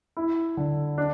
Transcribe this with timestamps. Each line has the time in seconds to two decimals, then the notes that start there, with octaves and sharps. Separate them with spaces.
0.17 E4
0.57 D3
0.98 D4